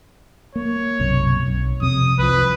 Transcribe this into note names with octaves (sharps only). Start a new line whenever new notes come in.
A#3 C#5
B1 F#2 C3
B1
F2 C3 D#6
C2 F3 B4